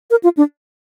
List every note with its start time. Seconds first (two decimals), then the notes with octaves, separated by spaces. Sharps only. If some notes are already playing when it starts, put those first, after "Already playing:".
0.11 A#4
0.24 F4
0.37 D4